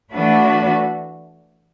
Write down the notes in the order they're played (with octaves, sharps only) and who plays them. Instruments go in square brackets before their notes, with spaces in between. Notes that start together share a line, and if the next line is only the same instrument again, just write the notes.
[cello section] E3 A3 D4 F#4 B4